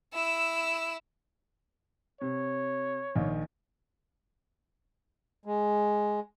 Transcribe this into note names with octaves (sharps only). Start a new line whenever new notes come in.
E4 E6
C3 C#5
A#1 D#3
G#3